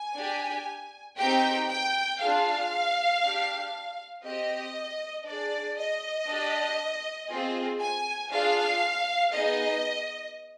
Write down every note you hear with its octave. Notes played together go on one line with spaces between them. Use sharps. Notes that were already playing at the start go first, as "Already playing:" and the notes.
Already playing: G#5
D4 G4
C4 D#4 G4 G5
G5
D4 F4 G#4 F5
D4 G4
C4 G4 D#5
D4 G#4 D5
D#5
D4 G4
C4 F4 G#4
G#5
D4 F4 G#4 F5
B3 D#4 G#4 D#5